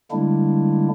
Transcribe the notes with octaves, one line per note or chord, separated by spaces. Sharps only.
D3 G3 G#3 A#3 D4 E4